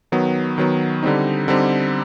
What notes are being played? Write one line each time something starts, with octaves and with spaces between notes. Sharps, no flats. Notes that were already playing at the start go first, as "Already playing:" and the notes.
D#3 F#3 B3
D#3 F#3 B3
D3 G3 C4 D#4
D3 G3 C4 D#4